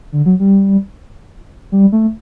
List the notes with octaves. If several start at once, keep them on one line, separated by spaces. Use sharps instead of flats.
D3
F#3
G3
G3
A3